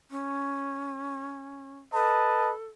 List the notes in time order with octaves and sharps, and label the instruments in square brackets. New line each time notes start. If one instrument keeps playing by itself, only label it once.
[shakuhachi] C#4
[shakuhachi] A4 [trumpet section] B4 D#5 A5